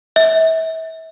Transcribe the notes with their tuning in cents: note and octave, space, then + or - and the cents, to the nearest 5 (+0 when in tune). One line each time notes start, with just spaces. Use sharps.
E5 -35